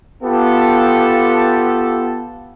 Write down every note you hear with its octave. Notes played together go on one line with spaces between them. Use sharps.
B3 F4 G4 A4